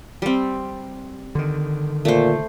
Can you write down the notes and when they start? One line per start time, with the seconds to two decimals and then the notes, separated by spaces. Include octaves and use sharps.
0.22 G3 C4
1.35 D3 D#3
2.05 A#2 A3 C5